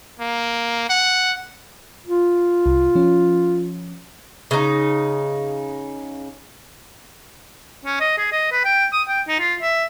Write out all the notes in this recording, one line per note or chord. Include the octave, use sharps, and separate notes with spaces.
A#3
F#5
F4
C2
F3 C#4
C#3 D#4
C#4
D#5
G#4
D#5
B4
G5
D#6
G5
D#4
F4
E5